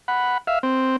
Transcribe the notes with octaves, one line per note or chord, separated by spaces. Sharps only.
F#5 B5
E5 F5
C4